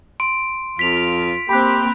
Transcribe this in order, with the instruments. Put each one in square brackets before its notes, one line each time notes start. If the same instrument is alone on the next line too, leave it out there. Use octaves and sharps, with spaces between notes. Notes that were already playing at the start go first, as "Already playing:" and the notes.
[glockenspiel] C6 [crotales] D7
[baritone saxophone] F2 [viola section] F4 [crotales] B6 F7
[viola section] A#3 C4 [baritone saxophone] G4 [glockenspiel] B5 F#6